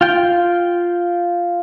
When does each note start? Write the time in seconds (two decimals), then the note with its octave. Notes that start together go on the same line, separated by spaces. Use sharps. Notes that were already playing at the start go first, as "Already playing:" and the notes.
0.01 F4 G5